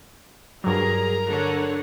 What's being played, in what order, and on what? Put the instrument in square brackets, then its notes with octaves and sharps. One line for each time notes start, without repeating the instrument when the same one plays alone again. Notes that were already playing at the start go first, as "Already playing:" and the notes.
[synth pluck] G2 F#3 [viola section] G#4 [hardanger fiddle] A#4 A#5
[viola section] D3 C#5 F#5